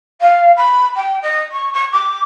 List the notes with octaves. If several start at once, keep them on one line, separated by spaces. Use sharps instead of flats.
F5
B5
G5
D#5
C#6
C#6
D6